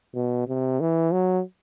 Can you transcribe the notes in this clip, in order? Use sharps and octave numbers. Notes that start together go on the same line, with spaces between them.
B2
C3
E3
F#3